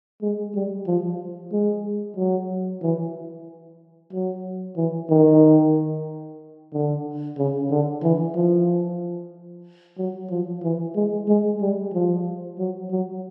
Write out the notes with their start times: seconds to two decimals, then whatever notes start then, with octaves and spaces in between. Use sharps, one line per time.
0.22 G#3
0.55 G3
0.87 F3
1.52 G#3
2.17 F#3
2.82 E3
4.13 F#3
4.77 E3
5.10 D#3
6.73 D3
7.38 C#3
7.70 D3
8.03 E3
8.35 F3
9.98 F#3
10.30 F3
10.63 E3
10.96 G#3
11.28 G#3
11.61 G3
11.93 F3
12.59 F#3
12.91 F#3